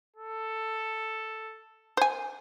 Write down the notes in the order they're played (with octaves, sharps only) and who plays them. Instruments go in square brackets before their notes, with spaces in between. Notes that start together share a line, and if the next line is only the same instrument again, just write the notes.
[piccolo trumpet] A4
[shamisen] C5 G#5